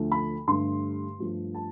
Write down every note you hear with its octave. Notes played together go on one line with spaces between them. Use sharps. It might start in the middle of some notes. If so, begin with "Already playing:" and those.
Already playing: D2 D3 F3 A3
B5
G2 D3 A3 C6
G2 F3 A3
A5